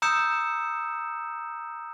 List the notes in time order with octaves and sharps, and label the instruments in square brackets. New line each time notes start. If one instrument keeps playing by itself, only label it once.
[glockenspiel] A#5 D#6 E6 G6 C#7 E7